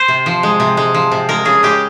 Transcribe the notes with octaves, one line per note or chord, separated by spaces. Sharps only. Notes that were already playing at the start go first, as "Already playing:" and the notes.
Already playing: C5
C3
F3
G#3
C3
G#3
F3
C3
G#3 A#4
C#3 G#4
G#3 G4